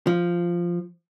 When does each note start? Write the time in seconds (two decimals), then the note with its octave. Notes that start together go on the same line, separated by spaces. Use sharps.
0.07 F3